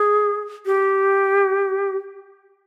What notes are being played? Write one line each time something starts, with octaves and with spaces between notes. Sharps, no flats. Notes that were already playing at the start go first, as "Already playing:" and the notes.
Already playing: G#4
G4